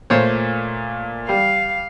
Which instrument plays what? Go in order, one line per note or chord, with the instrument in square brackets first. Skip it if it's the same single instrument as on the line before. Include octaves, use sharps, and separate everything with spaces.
[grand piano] A#2 A3 [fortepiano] C5 C#5
[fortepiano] G3 [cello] F5